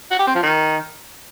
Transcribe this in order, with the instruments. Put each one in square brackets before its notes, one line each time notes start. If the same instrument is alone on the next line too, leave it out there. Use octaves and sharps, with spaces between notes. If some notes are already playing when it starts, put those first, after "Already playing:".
[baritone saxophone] F#4
G4
C4
F3
D#3